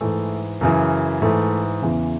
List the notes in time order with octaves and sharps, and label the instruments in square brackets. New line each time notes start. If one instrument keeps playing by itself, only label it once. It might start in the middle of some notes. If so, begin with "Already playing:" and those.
[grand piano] G#2 E3 A3
F#2 C#3 E3
G#2 E3 A3
E2 C#3 E3